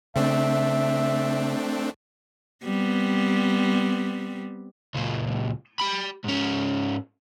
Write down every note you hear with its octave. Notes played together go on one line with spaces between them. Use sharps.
C#3 A3 C4 D4 E5
G3 B3 C4
C#2 A#2
G4 B5
G#2 C#4